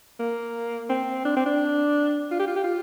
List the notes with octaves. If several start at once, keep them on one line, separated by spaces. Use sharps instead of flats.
A#3
C4
D4
C4
D4
F4
G4
F4
G4
F4